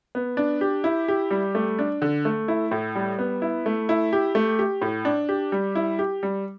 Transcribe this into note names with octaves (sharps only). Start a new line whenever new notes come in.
B3
D4
G4
E4
G4
G3
A3
D4
D3
A3
E4
A2
G3
B3
E4
A3
E4
G4
A3
G4
A2
D4
G4
G3
E4
G4
G3